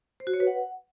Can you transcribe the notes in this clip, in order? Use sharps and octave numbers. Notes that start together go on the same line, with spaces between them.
C5
F#4
C#5
B4
F#5